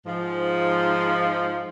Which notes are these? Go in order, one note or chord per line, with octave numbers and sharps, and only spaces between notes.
G#2 F3